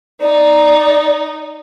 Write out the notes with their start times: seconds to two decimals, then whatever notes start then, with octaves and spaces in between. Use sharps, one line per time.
0.21 D#4 D5